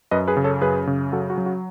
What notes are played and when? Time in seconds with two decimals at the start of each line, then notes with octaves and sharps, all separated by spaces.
0.11 F#2 B4 D#5
0.28 G#4 B4
0.37 C#3
0.44 A4 C#5
0.61 F#2 G#4 B4
0.87 C#3
1.12 F#3 F#4 A4
1.30 F#4
1.38 F#3
1.46 F#4